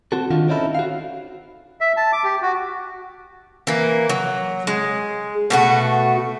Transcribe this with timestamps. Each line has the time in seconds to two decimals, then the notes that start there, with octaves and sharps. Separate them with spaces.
0.12 C4 F#4 A4
0.31 D#3 D4 F4 F#4
0.48 C4 C#4 D#4 E4 A4
0.75 F#4 F5
1.81 E5
1.97 A5
2.13 D6
2.24 G4
2.42 F#4
3.67 E3 A#3
4.09 F#3
4.67 G#3
5.50 B2 A3 F#4